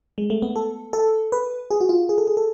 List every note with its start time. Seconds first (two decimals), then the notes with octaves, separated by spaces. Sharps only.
0.18 G#3
0.30 A3
0.42 B3
0.56 A4
0.93 A4
1.32 B4
1.71 G#4
1.80 F#4
1.89 F4
2.09 G#4
2.18 A4
2.27 G#4
2.37 A4